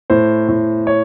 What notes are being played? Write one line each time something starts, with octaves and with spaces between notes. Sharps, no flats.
A2 C5
A2
C#5